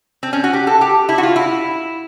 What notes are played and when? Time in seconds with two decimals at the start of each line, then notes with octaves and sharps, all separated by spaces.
0.23 C4
0.33 C#4
0.44 F#4
0.53 G4
0.67 A4
0.81 G4
1.09 E4
1.18 F#4
1.23 F4
1.36 E4